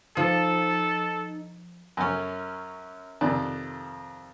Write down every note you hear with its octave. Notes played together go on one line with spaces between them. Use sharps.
F3 D#4 A4
F#2 C#4
F2 C3 D#3 D5